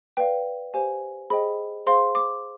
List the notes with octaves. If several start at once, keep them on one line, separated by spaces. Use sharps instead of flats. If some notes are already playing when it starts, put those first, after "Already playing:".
B4 D5 F5 G5
G4 C5 F5 G#5
G#4 C5 D#5 G5 B5
G#4 C5 F5 C6
D6